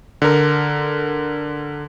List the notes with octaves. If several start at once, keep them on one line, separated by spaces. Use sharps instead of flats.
D3 A#4